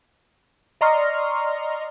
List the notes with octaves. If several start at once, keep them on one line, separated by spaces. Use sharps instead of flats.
D5 D#5 A#5 C6 C#6 F6